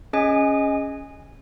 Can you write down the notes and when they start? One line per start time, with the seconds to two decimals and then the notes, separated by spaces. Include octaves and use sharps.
0.13 C#4 G#4 D#5 G#5